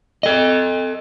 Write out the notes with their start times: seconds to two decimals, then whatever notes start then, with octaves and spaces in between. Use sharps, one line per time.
0.23 A4 D#5